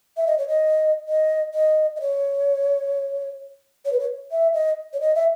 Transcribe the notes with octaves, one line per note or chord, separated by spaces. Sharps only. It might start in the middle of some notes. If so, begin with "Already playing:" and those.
E5
D#5
C#5
D#5
D#5
D#5
D#5
C#5
C#5
B4
C#5
E5
D#5
C#5
D#5
E5